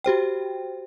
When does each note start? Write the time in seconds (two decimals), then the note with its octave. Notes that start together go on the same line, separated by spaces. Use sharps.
0.04 F#4 G4 C5 G5